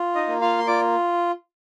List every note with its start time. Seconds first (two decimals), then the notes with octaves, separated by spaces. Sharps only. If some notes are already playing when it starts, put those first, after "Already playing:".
Already playing: F4
0.15 D#4 D#5
0.28 A#3
0.41 F4 F5
0.58 C6
0.67 F4 D5 D6